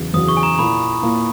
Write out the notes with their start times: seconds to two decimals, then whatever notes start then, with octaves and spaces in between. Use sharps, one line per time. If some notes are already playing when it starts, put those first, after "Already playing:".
Already playing: E2 C#3 F#3
0.14 E2 C#3 F#3 D#6
0.28 C#6
0.37 G#5
0.43 A#5
0.58 A#2 A#3 E4 B5
1.03 A#2 A#3 E4